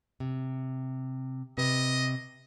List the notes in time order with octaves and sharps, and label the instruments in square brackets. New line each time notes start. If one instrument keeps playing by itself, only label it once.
[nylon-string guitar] C3
[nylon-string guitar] C3 B4 [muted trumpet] D#5